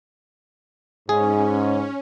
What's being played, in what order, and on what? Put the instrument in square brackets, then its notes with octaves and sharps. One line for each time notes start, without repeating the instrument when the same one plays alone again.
[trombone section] G#2 [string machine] C#4 [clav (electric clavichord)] G#4